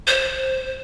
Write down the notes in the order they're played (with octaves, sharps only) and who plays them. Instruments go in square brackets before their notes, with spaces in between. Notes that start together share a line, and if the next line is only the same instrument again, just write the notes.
[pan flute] C5